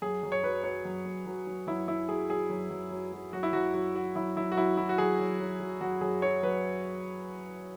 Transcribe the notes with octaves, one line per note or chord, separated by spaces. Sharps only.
F#2 G#4
F#2
C#5
F#3 B4
F#3 C#5
F#2
F#2
F#3
F#3
F#2 E4
F#2 E4
F#3 G#4
F#3 G#4
F#2
F#2
F#3
F#3
F#2 F#4
E4
F#2 F#4
F#3 F#4
F#3 F#4
F#2 E4
F#2 E4
F#4
F#3 E4
F#3 E4
F#4
F#2 G#4
F#2
F#3
F#3
F#2 F#4
F#2 G#4
F#3 C#5
F#3 B4